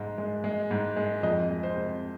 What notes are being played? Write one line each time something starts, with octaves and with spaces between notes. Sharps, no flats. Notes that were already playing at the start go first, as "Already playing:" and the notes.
Already playing: G#2 G#3
G#3
G#3
G#2
G#3
F2 D#5
G#3
C5
C3